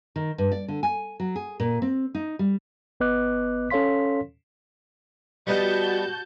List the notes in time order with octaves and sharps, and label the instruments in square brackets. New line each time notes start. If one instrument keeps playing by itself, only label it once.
[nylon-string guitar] D#3
G2
D5
D3
G#5
F#3
G#4
A#2
C4
D#4
G3
[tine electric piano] G1 B3 B4 D#5 D6 F#6
C#4 A4 C#5 F5 C6 B6
[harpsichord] G3 B3 D#5 [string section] F#4 A5 G6